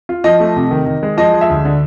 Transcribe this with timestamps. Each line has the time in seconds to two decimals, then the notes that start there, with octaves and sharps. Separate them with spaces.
0.09 F4
0.24 F3 D#5
0.40 A3
0.56 C3
0.71 D#3
0.86 D#3
1.03 G#3
1.17 F3 D#5
1.34 G#3
1.41 E5
1.50 D2
1.65 D3